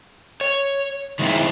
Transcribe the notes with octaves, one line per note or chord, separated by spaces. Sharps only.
C#5
D#3 G#3 C4 E4